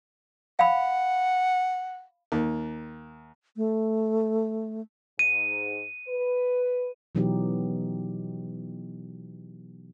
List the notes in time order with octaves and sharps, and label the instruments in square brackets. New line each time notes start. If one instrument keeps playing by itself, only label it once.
[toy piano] F5 B5 [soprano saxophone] F#5
[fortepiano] D#2
[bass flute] A3
[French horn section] G#2 [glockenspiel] D#7
[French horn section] B4
[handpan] B2 E3 F#3 B3 D#4 G4